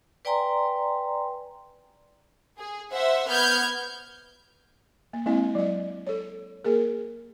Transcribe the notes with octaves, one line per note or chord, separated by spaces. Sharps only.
B4 D5 G5 G#5 A#5 C6
G#4
C5 E5 F#5
B3 F6 G6 G#6
A#3
G#3 A#3 C4 E4 D#5
F#3 D#5
A4 C#5
A#3 G#4 A#4